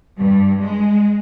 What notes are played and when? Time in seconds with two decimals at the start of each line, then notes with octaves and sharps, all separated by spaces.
0.19 G2
0.61 G#3